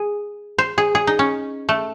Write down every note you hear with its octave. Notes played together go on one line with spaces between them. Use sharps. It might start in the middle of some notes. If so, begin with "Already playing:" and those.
Already playing: G#4
C5
G#4
G#4
D#4
C#4
A3